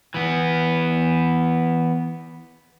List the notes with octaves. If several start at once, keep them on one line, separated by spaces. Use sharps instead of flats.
E3 B3